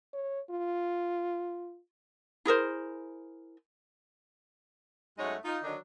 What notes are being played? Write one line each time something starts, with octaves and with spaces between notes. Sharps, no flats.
C#5
F4
E4 G#4 A#4 C5
F#2 G#3 A3 D#4 C#5 F#5
D#4 F4
D3 D#3 F#3 D4 D#4